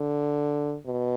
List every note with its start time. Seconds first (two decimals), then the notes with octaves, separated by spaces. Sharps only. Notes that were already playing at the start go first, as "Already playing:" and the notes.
Already playing: D3
0.86 B2